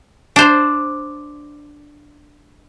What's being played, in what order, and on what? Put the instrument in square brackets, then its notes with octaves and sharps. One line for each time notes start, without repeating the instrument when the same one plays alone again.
[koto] D4 C5